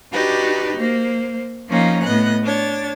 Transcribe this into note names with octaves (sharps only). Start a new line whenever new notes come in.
D4 D#4 F#4 G4 B4
A#3 C5
F3 A#3 C#4 D#4 F4
A2 B3 D#5 F#6
D4 C#5 A6